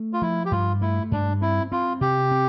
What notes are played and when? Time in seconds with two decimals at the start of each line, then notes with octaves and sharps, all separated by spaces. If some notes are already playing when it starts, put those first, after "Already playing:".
Already playing: A3
0.13 F4
0.22 F3 E4
0.45 G4
0.52 G2 F4
0.82 A3 E4
1.12 G2 D4
1.42 C4 E4
1.72 C4 F4
2.01 C3 G4
2.31 C4